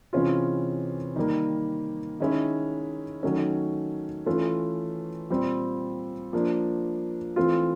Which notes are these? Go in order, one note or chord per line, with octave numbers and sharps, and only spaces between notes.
C3 E3 G#3 C#4 F4
D#3 G3 A#3
D#3 G#3 C#4 E4
D#3 F#3 A3 C#4
E3 A3 C#4 F4
A#2 G3 C4
F3 A#3 D4
E3 A3 C4 F4